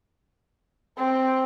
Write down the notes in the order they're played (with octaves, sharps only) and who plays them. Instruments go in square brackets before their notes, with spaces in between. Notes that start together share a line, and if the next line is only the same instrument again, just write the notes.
[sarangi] C4